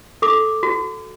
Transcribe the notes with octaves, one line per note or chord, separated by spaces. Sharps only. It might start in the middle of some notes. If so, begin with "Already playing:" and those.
A4 D6
F#4